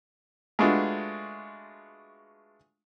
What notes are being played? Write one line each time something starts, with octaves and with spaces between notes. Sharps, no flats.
G#3 A3 B3 D4 F4 F#4